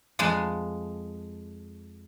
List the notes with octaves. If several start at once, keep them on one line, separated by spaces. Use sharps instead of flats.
F2 G#3 G#5 A5